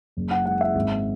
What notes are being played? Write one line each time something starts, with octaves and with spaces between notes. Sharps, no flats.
F#1
F#5
G#3 F#5
E5
G#1